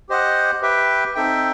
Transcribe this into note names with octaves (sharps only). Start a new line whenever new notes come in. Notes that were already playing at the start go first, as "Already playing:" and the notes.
G4 C5 D#5 F#5
G4 B4 E5 G5
C4 D#4 A4 E5 G5